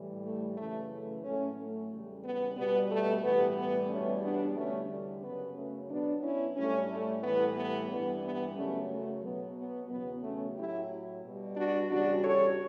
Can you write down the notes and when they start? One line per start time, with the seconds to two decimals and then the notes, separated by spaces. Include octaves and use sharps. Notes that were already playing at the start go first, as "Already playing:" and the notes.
Already playing: A2 E3 G3
0.24 A3
0.57 F#2 C#3 E3 A3
0.90 A3
1.23 A2 F#3 A3 C#4
1.57 A3
1.90 E2 C#3 G3
2.24 B3
2.57 B2 G3 B3
2.90 A3
3.23 A2 E3 G3 B3
3.57 B3
3.90 E2 B2 G3 A3 C#4
4.23 B3 D4
4.57 E2 D3 G3 A3 C#4
5.23 F#2 C#3 F#3 B3
5.57 A3 C#4
5.90 B2 F#3 B3 D4
6.23 C#4 E4
6.57 A2 G3 A3 C#4
6.90 A3
7.23 A2 E3 G3 B3
7.57 B3
7.90 G2 E3 G3 B3
8.24 B3
8.57 F#2 C#3 F#3 A3 C#4
8.91 A3
9.24 B2 F#3 B3
9.57 B3
9.90 E2 C#3 F#3 B3
10.23 A3 C#4
10.57 A2 F#3 E4 G4
11.23 B2 G3
11.57 D4 F#4
11.90 E2 C#3 G3 D4 F#4
12.24 A4 C#5